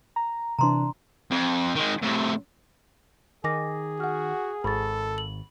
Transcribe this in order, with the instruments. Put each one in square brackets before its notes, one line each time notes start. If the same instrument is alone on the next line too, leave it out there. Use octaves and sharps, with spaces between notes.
[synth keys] A#5
[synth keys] C3 E3 D4 [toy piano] A#5 C6
[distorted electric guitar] F2
D#3 G#3
A2 C3
[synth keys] D#3 [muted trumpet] G#4 [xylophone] G#5 D6 A#6
[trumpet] F#4 [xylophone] F#5 F6
[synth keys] G#1 [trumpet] A4 [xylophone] B5 C#6 A6
[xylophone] F#7